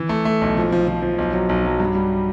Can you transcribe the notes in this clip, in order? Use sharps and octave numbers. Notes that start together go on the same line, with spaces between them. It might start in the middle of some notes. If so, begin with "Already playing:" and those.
Already playing: E3
A3
A3
B1
F3
F3
F3
F3
B1
F#3
B1
F#3
G2
G3